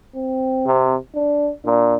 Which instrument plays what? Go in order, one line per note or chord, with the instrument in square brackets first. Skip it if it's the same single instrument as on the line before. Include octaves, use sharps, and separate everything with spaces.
[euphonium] C4
[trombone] C3
[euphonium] D4
[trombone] A#2 [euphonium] D4